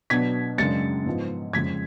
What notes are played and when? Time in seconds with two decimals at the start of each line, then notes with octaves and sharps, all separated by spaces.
0.10 B2 F#3 B3 D4 G#6 B6
0.58 F#2 C#3 G#3 D4 A6 C#7
1.06 G#2 F3 B3
1.53 F2 C#3 G#3 G#6 B6